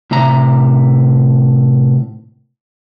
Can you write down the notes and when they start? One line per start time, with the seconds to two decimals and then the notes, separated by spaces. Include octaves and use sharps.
0.11 A2 C3 E5 A#5